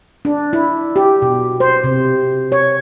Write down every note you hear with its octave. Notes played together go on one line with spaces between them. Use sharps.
D4
E4
G4
B2
C5
C3
C#5